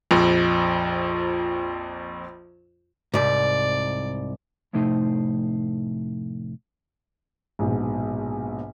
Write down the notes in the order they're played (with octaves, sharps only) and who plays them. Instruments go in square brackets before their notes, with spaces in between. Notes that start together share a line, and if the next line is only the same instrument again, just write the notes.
[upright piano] A#1 F2
[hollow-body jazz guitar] C2 G#2 [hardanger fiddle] D5
[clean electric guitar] F2 A2 C3 A3 D#4 C5
[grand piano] A#1 G#2 B2